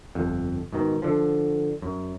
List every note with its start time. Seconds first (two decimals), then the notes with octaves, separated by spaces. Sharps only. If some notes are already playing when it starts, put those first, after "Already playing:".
0.15 G1 F2
0.72 G#2 B2 D#3
1.02 D3 F3
1.82 F#2